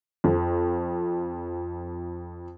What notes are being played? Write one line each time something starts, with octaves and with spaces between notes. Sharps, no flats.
F2 F3